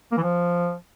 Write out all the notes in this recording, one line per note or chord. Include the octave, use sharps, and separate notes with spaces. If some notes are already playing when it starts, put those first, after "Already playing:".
A#3
E3
F3